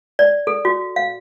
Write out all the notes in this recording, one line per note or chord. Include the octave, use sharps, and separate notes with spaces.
D5
A4
F#4
F5